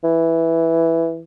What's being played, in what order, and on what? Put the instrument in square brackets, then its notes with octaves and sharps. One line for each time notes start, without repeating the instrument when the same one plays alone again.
[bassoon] E3